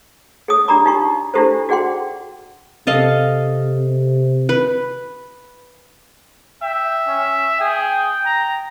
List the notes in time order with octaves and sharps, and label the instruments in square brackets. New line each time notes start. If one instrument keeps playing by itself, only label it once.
[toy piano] G#4 C#5 D#6
D4 G4 D5 A#5 B5 D6
D#4 F4 G4 C#6
D4 E4 F4 G4 A4 C5
F#4 G#4 D5 F#5 G5 C6
[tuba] C3 [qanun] A4 D#5 F5
[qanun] B4
[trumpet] E5 [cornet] G5
[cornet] C#4
[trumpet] G#4 [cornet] G5
[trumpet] A#5